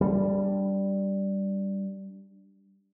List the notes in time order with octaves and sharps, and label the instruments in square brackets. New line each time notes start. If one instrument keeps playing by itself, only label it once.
[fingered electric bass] G3 D4